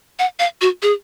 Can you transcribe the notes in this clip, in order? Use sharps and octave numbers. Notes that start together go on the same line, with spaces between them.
F#5
F5
F#4
G#4